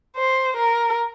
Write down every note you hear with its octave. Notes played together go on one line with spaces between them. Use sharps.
C5
A#4